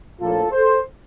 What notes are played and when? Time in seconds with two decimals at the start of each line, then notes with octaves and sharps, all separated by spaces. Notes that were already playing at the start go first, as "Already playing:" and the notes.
0.20 A#1 A2 F3 A#3 F4 A4
0.51 A4 C5